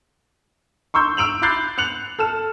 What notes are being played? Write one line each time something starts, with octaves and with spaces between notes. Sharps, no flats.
C6 C#6 E6 G6
E6 D7 F7 F#7
B5 D6 F#6 G6 A6 C7
F#6 C#7 F7 F#7
A4 F6 E7